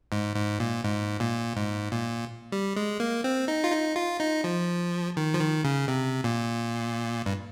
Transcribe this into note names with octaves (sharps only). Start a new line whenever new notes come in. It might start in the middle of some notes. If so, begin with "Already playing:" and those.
G#2
G#2
A#2
G#2
A#2
G#2
A#2
G3
G#3
A#3
C4
D#4
F4
D#4
F4
D#4
F3
D#3
F3
D#3
C#3
C3
A#2
G2